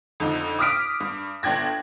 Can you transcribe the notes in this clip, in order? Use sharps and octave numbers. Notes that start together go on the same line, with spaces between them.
F2 D3 D#4
D6 D#6 F6 B6 D7
G2
G1 D4 G5 G#6 A#6